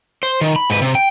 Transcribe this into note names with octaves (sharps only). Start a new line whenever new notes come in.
C5
D#3
B5
G#2 B4
C3
G5